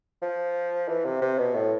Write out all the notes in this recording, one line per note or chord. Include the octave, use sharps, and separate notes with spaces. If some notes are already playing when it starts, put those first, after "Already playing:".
F3
E3
C3
C3
B2
A2